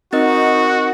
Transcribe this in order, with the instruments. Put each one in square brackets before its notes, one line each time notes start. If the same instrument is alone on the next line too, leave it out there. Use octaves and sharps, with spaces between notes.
[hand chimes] C4 A#4 D#5 [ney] D#4 [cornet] F#4